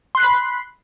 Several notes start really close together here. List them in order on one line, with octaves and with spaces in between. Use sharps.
C6 F#6 C7 B5